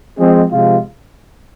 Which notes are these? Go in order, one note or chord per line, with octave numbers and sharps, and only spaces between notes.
F3 G#3 C4 G#4 D#5
C3 F3 G#3 F4